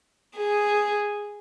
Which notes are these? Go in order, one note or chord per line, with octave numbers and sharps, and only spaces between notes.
G#4